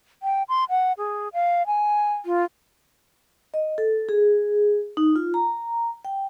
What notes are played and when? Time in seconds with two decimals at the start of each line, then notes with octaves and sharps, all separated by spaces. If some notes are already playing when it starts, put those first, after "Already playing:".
0.23 G5
0.49 C6
0.70 F#5
0.98 G#4
1.33 F5
1.67 G#5
2.26 F4
3.54 D#5
3.78 A4
4.09 G#4
4.97 D#4
5.16 F4
5.34 A#5
6.05 G5